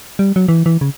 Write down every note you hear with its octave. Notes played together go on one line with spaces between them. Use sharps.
G3
F#3
E3
E3
C#3